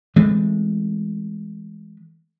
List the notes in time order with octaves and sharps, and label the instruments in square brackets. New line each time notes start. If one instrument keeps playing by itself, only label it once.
[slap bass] E3 G#3 A3 C4